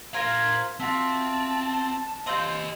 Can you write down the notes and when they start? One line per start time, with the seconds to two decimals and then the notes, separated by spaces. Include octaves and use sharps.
0.14 F4 A#4 C5 A#5 G#6
0.80 C4 F4 F#4 E5 A5
2.27 C4 F4 G4 D#5 G6